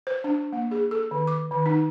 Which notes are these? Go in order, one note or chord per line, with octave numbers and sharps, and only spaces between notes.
C5
D4
A#3
G#4
A4
D#3
D6
D#3
D#4